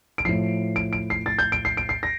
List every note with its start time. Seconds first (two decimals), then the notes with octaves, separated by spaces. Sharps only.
0.18 D7
0.25 A2 F3 C7
0.76 D7
0.93 D7
1.10 C7
1.26 A6
1.39 G6
1.52 D7
1.65 C7
1.77 D7
1.89 C7
2.03 A#6